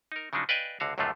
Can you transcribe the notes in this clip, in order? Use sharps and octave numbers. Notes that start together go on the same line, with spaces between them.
D#4 A#4
C#3 F3 F#3 D4 D#4
B4 D5 D#5 F5 G5 G#5
C#2 D3 F#4 F5
C#2 F#2 A2 D3 A3 F4